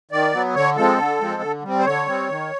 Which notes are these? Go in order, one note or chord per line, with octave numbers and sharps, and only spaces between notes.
D#3 D5
F#3 B3
D3 C#5
F3 G#3 C4 A4
D3
F3 G#3 C4
D3
G3
C4
C5
D3 C#5
G3 C4
D#3